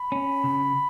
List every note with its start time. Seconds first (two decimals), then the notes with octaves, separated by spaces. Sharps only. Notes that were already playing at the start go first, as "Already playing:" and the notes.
Already playing: B5
0.12 C#4
0.44 C#3